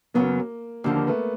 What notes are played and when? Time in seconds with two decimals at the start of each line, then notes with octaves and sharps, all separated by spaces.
0.14 F#2 C#3 F#3 A#3 B3
0.84 D#2 D3 F3 A#3
0.96 A#3
1.07 A3 B3